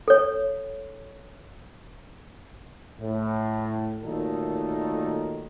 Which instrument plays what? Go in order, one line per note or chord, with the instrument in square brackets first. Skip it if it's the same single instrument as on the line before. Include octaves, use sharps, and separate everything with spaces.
[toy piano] A4 C#5
[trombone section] A2
A#2 D#3 F#3 A3 D#4 A4